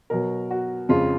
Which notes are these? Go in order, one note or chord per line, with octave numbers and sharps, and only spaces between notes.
B2 F#3 A#4
F#4
F2 C#3 G#3 F4